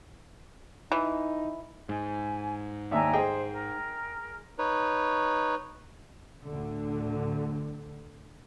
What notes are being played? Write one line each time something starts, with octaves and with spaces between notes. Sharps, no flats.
E3 D#4
G#2 G#5
D#2 D4 E5 G5 G#5 A#5
G#4 C5 D#5 G5
A#4
D#4 B4 C#5
D2 A2 D3